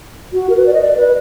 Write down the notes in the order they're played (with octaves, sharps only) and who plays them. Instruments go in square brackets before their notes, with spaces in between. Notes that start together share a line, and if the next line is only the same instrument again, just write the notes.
[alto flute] F#4
A#4
B4
D5
D#5
D5
B4